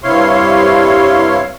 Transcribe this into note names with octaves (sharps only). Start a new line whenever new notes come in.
G2 C3 E4 C#5 F5 C6